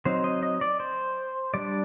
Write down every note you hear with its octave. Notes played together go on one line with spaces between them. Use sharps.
F#3 C4 D#4 C5
D#5
D#5
D5
C5
G3 D4 D5